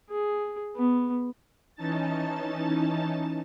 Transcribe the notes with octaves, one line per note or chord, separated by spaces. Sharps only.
G#4
B3
E3 C#4 D#4 A5 A6